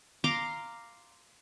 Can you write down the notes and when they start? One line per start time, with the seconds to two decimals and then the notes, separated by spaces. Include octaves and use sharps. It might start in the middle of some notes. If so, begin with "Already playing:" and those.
0.24 F5 A#5 C6 D6